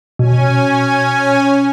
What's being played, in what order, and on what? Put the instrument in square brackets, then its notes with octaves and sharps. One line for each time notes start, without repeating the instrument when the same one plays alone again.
[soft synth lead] B2 [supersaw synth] C#4 G#5